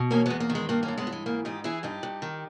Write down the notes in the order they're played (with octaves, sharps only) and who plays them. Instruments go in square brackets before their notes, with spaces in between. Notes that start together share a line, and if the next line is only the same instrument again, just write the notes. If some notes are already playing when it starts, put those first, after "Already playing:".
Already playing: [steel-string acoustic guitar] B2
E2 A#3 C#4
E2 G#3 B3
A#3
D#3
G#3
G2 A#3
A#3 C#4
G2
G#3 B3
E3
G#3
G#2 A#3
G#2 D#4 G4
E3 E4 G#4
G2 D#4 G4
G2
D#3